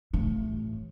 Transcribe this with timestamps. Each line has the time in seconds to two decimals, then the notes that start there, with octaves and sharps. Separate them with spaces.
0.13 A1 A2